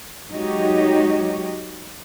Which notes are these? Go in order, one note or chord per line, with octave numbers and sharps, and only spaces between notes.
F#3 G#3 D#4 F#4 G4 C#5